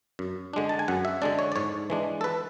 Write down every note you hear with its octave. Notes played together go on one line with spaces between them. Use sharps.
F#2
D3 G#3 D4
A5
G#5
F#2 F#5
E5
D3 G#3 D4 D5
C#5
D5
G#2 C#5
E3 G#3 D4
A4
B4